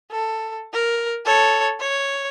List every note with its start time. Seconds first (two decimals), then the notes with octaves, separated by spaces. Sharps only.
0.11 A4
0.73 A#4
1.25 A4 C#5
1.80 C#5